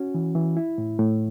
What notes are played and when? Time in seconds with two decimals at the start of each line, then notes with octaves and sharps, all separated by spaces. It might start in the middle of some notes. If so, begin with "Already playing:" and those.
Already playing: C#4 F#4
0.14 E3
0.35 E3
0.57 E4
0.78 A2
0.99 A2